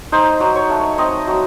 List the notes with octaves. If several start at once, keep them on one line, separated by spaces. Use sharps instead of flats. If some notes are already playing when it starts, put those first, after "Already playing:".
D#4 C5
F#3
C#5
A3
C4 D#5
F#3